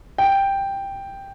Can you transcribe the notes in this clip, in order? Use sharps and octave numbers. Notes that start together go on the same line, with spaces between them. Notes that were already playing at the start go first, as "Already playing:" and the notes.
G5